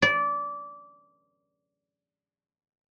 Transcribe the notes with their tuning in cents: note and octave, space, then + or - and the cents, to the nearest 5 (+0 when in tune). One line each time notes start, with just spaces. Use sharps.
D5 -20